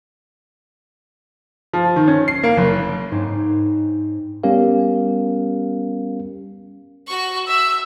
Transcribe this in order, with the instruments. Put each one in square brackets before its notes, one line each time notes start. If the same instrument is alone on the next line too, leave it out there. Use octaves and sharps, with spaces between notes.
[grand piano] F3
D#3
C#4
C7
A#3
F#1
[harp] G#2 C4 D#4 C5 C#5 D6
[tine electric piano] G3 B3 C#4 G4 A#4 F5
[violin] F#4 C#6
[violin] E5 [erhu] E6